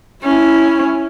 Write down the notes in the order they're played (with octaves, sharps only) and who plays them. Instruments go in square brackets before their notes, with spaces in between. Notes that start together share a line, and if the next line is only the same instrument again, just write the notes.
[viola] C#4 E4